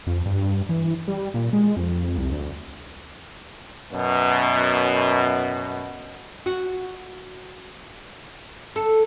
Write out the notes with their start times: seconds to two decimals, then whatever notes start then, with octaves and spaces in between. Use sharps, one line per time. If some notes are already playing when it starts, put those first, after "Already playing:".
0.07 F2
0.26 G2
0.69 E3
1.08 G3
1.34 A#2
1.53 G#3
1.77 F2
2.18 C2
2.32 D2
3.93 F#2 B2
6.46 F#4
8.76 A4